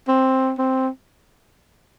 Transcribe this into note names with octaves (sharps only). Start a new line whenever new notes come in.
C4
C4